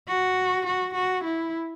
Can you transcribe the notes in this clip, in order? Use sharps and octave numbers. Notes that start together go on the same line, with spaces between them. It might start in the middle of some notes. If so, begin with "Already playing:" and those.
F#4
F#4
F#4
E4